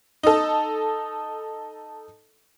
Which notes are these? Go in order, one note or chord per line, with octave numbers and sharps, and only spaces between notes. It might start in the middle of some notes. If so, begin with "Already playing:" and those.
D#4 A4